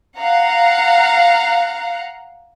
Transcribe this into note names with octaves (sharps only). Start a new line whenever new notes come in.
F5 F#5 A#5